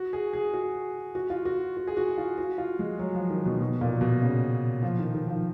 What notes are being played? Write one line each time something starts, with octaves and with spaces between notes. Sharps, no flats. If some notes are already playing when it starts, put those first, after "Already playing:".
Already playing: F#4
G#4
G#4
F#4
F#4
F4
F#4
F#4
G#4
F#4
F4
F#4
F4
G#3
F#3
F3
D#3
B2
B2
A#2
B2
C#3
F3
D#3
D#3
F3